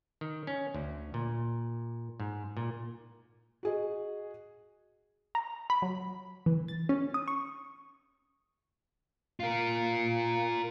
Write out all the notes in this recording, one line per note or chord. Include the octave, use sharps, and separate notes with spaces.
D#3
C#4
D2
A#2
G#2
A#2
F#4 G#4 D#5
A#5
B5
F#3
E3
A6
C#4
D#6
C#6
F4 A#4